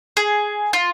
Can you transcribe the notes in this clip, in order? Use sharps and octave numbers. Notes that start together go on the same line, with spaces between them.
G#4
F4